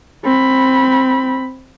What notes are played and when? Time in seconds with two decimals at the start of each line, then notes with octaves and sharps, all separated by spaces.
0.24 C4 B5